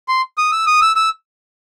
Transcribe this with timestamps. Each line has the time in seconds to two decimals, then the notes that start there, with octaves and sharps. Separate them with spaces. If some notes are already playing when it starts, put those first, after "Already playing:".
0.08 C6
0.38 D#6
0.52 E6
0.67 D#6
0.82 E6
0.96 E6